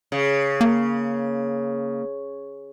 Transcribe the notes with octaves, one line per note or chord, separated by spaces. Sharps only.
C#3
A#3